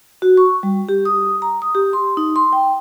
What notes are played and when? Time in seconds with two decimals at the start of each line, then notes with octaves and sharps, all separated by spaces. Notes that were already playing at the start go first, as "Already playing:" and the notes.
0.22 F#4
0.37 C#6
0.63 G3
0.89 G4
1.05 D#6
1.42 A#5
1.62 D#6
1.75 G4
1.93 C6
2.17 D#4
2.36 C6
2.53 G5